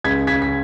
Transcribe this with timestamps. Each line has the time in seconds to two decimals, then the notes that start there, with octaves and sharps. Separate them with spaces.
0.04 C#2 G#6 B6
0.27 C#3 G#6 B6
0.42 B6